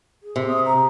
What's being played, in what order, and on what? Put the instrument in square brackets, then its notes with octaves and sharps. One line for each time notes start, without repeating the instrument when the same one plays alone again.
[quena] G#4
[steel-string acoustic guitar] C3
[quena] D#6
A#5